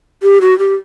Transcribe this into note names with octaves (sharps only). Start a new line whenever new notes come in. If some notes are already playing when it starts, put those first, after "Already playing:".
G4
F#4
G4